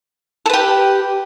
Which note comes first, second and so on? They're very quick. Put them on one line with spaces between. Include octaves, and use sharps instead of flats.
A4 B4 G4